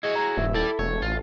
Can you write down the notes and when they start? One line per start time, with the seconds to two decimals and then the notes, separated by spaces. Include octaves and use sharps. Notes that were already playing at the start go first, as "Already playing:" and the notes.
0.03 E4 F#4 G#4 C#5 D#5
0.15 A#5
0.37 D#1 G2 E5
0.54 E4 G4 A4 D5
0.79 E1 A3 C#5
1.02 A1 F4